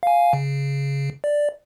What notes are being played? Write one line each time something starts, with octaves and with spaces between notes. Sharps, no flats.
F5 G#5
C#3
D5